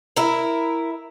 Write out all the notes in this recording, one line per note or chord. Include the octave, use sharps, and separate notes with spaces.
E4 A#4